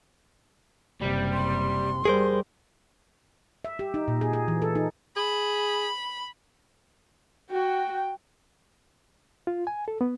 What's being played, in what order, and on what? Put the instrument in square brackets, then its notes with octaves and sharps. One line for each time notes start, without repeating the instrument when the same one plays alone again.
[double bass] F#1 C3 [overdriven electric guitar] G3
[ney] C6
[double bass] G3 [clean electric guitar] G#4 A#4 C5
[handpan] E5
G4
D#4
A#2
G#4
G#4
E3
A4
D#4
[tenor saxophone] G#4 [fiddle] B5
[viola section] F#4 [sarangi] G5
[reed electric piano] F4
G#5
A4
B3